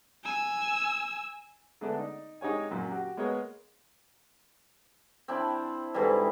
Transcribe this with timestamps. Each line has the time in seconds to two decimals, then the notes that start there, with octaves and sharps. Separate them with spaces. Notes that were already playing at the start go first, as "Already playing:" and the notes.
0.25 G#5 E6
1.81 D3 G#3 A3 B3 D4
1.97 D#4 D5
2.41 G#3 D#4 G4 C#5 G#5
2.71 F#2 A#2 F#3
2.91 F#4 G4
3.17 G#3 A#3 B3 C#5 D#5
5.28 C4 D4 E4
5.94 G#2 D3 E3 G3